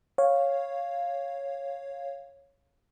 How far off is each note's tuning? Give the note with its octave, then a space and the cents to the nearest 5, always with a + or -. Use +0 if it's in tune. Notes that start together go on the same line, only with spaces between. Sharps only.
C#5 -5 F5 +0